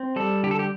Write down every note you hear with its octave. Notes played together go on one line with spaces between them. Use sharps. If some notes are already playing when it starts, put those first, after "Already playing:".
Already playing: C4
G3 A4
D3 G4
A4
G4